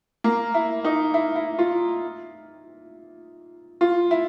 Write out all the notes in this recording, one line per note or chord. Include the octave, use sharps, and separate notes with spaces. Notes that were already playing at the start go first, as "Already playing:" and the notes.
A#3
E4
D#4
E4
E4
F4
F4
E4